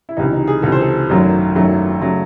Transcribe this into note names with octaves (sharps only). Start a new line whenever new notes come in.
E4
C#2 C3 E3 D#4
D#4
G#4
C#2 C3 E3 A4
C5
A4
G#1 F#2 D#3 F#3 A3
G#1 F#2 D#3 F#3 A3
C#3 F#3 A3